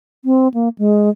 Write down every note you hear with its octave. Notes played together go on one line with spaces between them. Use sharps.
C4
A#3
G#3